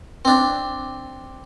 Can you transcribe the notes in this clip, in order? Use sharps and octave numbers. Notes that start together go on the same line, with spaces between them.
C4 D4